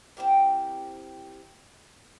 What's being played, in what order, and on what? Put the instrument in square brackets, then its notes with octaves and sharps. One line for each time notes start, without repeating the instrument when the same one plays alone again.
[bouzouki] C4 E4 G4 A#4